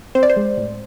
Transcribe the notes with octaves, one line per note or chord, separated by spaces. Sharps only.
C4 C5
D5
C5
G#3
A2